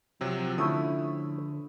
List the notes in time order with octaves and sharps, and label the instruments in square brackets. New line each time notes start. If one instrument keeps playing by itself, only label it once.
[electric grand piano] C3 F#3 C4 [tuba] F3
[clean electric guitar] D3 [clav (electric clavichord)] A3 C#4 E4 [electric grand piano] B5 D#6